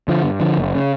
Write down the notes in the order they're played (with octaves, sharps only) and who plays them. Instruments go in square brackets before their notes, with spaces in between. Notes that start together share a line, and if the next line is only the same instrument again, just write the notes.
[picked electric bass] D3 F3
G2
D3 F3
F#1
C#3